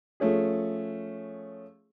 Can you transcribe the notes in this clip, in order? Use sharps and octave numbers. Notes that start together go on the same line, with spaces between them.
F3 A3 C#4 G#4